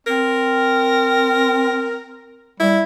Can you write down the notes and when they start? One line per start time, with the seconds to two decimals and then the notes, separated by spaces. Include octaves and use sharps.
0.07 C4 A#4
2.60 G3 E4